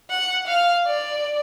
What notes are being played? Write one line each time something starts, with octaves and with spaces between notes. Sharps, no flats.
F#5
F5
D5